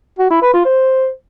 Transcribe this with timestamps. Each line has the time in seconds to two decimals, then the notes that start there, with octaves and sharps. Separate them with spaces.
0.19 F#4
0.30 E4
0.42 B4
0.54 F4
0.65 C5